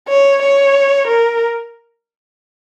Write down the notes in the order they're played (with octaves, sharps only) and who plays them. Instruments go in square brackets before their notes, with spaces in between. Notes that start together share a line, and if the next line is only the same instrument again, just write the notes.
[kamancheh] C#5
C#5
A#4